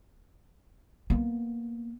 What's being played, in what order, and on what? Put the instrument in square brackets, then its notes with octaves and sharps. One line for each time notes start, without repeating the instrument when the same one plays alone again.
[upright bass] A#3 B3